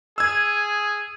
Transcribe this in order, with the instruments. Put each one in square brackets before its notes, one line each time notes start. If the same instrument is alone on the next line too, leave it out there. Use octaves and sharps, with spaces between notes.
[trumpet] G#4 [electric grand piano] E6 G#6